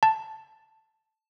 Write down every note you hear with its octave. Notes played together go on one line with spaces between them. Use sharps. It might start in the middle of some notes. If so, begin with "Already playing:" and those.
A5